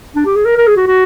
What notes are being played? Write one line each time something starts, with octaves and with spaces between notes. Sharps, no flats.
D4
G4
G#4
A#4
A#4
G#4
F#4
F#4